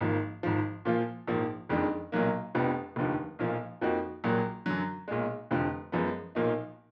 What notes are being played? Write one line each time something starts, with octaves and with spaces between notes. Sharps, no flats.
G#1 G#2 F3 A#3
G#1 G#2 F3
A#2 F3 A#3 F4
A#1 G#2 F3 A#3
F#1 F2 D#3 G#3 D4
B1 A#2 F#3 A#3
F1 F2 F3 B3 D4
F1 D#2 D3 F3
B1 A#2 F3 A#3
F2 F3 A#3 D#4 F#4
A#1 A#2 F#3 A#3
F#2 D3 F#3
B1 A#2 G#3
F1 F2 D3 F3
F#2 F3 G#3 B3
B1 A#2 F3 A#3 D#4